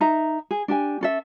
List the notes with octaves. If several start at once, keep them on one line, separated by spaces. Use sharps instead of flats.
D#4 E5 A#5
G#4
D4 G4 G#5
C#4 A4 E5